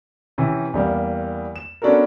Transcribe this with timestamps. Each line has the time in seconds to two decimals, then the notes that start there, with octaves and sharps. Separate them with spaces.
0.38 C3 E3 C#4
0.74 E2 G3 A#3
1.56 E7
1.82 B3 C#4 D4 F#4 A4 A#4